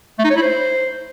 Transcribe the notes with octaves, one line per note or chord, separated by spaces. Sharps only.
A3
D#4
C#5
E4
C5